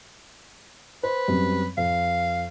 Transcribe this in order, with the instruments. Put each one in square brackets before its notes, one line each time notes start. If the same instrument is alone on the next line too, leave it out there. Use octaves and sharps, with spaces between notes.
[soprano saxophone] B4 [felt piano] C5
[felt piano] F#2 G3 C4
[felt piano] F2 [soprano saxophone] F5